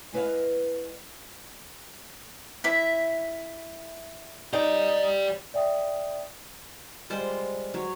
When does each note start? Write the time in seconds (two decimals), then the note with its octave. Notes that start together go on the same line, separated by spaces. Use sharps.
0.13 G#3 E4 B4 D5 D#5 F5
2.64 E4 E5
4.53 D#4 G4 D5
5.54 D5 E5 G5 D#6
7.10 G3 G#3 F4 C5
7.74 F#3 C#5